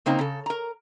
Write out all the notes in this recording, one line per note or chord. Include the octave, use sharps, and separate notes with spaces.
C#3 A#3 C4 D#4
C#3 A4
A#4 A#5